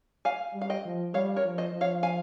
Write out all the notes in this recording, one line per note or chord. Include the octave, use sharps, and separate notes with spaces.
F5 G#5
G3
F5
D#5 G5
F3
G3 C#5 F5
A#4 C#5
F3
C5 D#5
F3
C#5 F5
F5 G#5